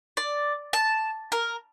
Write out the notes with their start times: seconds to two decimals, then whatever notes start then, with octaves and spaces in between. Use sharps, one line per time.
0.17 D5
0.73 A5
1.32 A#4